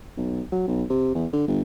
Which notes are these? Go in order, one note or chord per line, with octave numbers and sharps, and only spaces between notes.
B1
F#3
B1
C3
E2
D3
G1